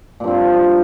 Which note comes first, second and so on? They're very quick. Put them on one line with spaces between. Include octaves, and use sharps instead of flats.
A#2 G2 C4